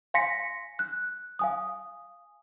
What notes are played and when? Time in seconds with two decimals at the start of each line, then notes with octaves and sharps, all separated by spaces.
0.14 F5 G#5 C6 A#6 B6 C#7
0.79 F#6
1.39 F5 G#5 D#6